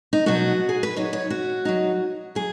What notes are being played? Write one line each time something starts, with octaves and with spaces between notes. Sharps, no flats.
D#4
B2 F#3 B3 F#4
G#4
B4
F#3 D#4 C#5
C#5
F#4
F#3 D#4
F#3 G#4